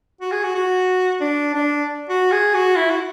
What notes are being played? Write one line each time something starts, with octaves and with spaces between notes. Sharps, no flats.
F#4
G#4
F#4
F#4
D4
D4
F#4
G#4
F#4
E4
F#4